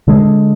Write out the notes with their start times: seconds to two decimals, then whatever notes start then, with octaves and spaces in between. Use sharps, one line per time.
0.08 D3 G#3